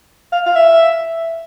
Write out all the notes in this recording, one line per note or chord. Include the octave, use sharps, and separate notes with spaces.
F5
F5
E5